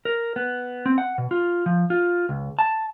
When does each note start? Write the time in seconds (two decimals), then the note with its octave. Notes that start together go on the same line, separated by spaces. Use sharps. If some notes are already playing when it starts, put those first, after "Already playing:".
0.05 A#4
0.36 B3
0.86 C4
0.98 F#5
1.18 B2
1.31 F4
1.66 F3
1.90 F4
2.29 C#2
2.59 A5